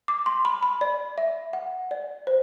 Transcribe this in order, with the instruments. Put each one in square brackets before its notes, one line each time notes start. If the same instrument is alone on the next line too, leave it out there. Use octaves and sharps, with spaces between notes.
[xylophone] D6
C6
B5
B5
D5
E5
F#5
D5
C5